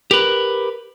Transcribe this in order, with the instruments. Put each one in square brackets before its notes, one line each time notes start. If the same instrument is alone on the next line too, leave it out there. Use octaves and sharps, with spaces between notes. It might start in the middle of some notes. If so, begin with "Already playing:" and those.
[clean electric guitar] G4 A#4 B4